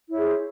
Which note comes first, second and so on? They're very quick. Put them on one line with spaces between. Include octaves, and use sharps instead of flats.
E4 C#5 G#4 C5